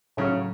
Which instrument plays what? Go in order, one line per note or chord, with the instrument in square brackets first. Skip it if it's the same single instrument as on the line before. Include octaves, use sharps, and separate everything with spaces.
[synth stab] A2 F#3 C#4 [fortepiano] C#3